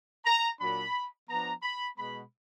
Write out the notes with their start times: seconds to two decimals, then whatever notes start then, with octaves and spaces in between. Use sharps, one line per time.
0.25 A#5
0.59 A#2 F#3 D4 B5
1.29 F3 B3 D4 A#5
1.63 B5
1.97 B2 G#3 B3 B5